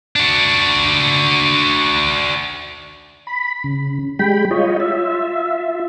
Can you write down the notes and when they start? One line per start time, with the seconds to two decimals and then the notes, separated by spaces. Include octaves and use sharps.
0.16 D4 F#4
3.27 B5
3.64 C#3
4.19 G3 G#3 G5 B5
4.51 F4 C#5 D#5
4.80 F4 E5